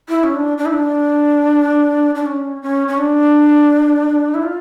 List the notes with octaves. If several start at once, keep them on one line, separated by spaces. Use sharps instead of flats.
E4
C#4
D4
D4
E4
D4
D4
C#4
C#4
C#4
D4
E4
F4